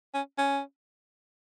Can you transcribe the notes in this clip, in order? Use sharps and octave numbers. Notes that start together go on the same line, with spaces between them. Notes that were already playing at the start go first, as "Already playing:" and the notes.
C#4
C#4